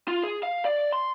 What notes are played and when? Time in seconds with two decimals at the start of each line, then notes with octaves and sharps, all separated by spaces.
0.08 F4
0.24 G#4
0.43 F5
0.65 D5
0.92 C6